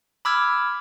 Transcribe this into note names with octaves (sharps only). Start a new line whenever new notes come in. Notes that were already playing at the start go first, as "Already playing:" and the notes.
B5 D6 E6 F6 G#6